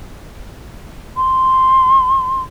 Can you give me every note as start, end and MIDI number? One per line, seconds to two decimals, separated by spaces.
1.17 2.42 84